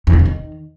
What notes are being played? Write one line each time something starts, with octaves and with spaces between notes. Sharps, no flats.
E2
D3
C#3
D#3